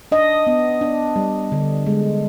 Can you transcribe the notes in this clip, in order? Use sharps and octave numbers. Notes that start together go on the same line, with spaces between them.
D4 D#5
B3
D4
G3
D3
G#3